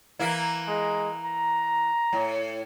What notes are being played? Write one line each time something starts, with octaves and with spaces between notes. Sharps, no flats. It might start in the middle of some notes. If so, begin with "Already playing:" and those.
E3 A#3 E4
G#3
A#5
A2